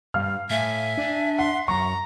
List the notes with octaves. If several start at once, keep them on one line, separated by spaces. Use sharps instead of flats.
G2 F5 F6
A2 E5 G#5
D4
F#5 C6
F#2 A#5 C#6